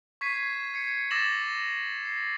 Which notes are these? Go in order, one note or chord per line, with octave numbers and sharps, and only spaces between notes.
C#6 G#6 B6 C7 D#7
G#6 C7 C#7
D6 E6 A6 A#6 E7 F#7
C7